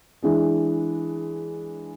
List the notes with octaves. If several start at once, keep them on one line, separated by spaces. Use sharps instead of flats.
E3 G#3 D4